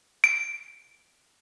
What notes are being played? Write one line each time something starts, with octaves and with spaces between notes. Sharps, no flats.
D7